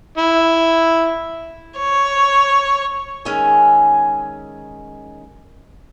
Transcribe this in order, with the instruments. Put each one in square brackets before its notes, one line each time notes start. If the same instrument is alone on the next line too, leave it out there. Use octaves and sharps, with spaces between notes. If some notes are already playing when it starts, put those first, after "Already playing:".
[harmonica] E4
[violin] C#5
[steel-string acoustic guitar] D#3 G#3 C#4 D#5 E5 G#5